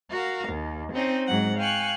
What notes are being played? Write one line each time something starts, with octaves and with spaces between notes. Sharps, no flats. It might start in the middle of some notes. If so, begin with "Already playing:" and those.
F#4 A#4 F5
D#2
C4 C#4 D#4
G#2 F#3 F#5
F5 G5 G#5 C#6 F#6